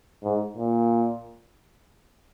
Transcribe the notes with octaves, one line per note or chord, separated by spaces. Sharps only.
G#2
A#2